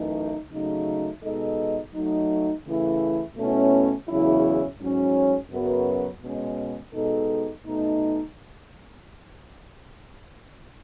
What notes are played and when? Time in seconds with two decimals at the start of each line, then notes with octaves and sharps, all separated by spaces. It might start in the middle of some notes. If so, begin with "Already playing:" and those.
Already playing: F#2 E3 A3 D#4
0.51 C#3 F#3 A3 D#4
1.23 B2 G#3 D#4 A4 D#5
1.95 F#3 A3 D#4
2.66 C#3 E3 A3 E4
3.37 B2 A3 C#4 E4
4.08 E2 C#3 F#3 C#4 E4
4.79 G#2 F#3 C#4
5.50 F#2 C#3 F#3 B3 F#4
6.22 B2 G#3 C#4
6.93 B2 G#3 D#4 A4
7.64 B2 A3 D#4